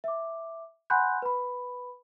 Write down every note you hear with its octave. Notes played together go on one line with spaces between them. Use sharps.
E5 D6
F#5 G#5 B5 C6 F#6 G6
B4 B5